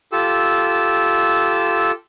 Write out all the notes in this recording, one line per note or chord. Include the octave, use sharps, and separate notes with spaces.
F4 G4 A4 E6